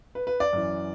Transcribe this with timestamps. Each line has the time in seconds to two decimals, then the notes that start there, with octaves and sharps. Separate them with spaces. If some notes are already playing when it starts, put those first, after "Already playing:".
0.15 B4
0.27 B4
0.40 D5
0.53 F#2 E3